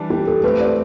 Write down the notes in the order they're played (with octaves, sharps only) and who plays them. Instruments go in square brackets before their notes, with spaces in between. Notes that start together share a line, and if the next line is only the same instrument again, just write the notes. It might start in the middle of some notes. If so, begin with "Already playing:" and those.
Already playing: [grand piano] E3 G3 D4 [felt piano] A5
[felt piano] G4
A4
[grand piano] A3 C4 G4 [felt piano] B4
[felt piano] D5